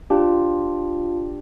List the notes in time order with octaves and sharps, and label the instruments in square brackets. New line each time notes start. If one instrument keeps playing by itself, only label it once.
[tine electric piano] D4 G4 [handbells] F4 C5 F5 A5